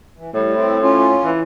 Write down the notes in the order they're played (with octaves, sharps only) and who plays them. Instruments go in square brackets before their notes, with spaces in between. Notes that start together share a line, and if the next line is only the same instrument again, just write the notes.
[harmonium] E3
[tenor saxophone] A2 [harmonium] G3
[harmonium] C4 E4
C#4 F4
[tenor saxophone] E3